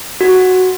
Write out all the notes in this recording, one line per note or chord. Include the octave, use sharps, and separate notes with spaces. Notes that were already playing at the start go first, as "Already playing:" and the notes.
F#4